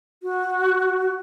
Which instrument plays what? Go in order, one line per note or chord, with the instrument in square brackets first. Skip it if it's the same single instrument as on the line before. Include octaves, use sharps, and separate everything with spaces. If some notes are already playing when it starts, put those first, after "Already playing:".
[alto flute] F#4